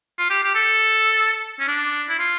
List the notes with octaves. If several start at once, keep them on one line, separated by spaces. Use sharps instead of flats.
F4
G4
G4
A4
C#4
D4
E4
F4